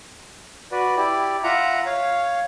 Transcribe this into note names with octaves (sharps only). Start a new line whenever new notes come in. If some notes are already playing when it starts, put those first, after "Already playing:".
F#4 B4 D5
E4 G4 D5
F4 E5 F#5 A#5
C#5 F5